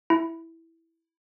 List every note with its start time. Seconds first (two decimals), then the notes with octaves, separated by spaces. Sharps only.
0.10 E4